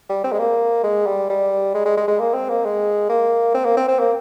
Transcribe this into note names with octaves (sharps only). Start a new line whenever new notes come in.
G3
C4
G#3
A#3
G#3
G3
G3
G#3
G#3
G#3
G#3
A#3
C4
A#3
G#3
A#3
C4
A#3
C4
C4
A#3